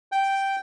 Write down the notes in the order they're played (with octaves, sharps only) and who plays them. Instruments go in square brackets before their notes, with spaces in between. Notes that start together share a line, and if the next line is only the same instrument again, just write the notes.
[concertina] G5